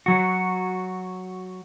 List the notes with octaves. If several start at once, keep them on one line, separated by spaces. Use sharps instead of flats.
F#3 F#4